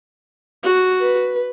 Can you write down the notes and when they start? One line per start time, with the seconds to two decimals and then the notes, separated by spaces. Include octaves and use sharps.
0.63 F#4
1.01 B4